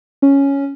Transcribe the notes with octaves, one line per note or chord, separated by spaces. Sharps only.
C#4